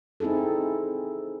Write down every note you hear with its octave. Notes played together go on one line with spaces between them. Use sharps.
C4 D#4 E4 G#4 A4